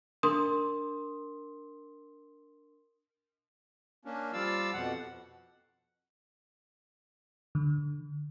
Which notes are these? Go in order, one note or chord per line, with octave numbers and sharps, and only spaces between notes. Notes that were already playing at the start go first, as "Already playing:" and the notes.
D4 A#4 C6 D#6
A#3 C#4 D4
F3 G3 F4 D5 F5 E6
F2 B2 F#5
D3